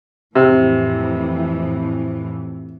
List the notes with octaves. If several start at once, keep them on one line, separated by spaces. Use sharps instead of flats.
F2 A2 C3 E3